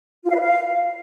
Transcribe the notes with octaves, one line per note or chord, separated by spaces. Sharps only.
F4
F5
B4
F5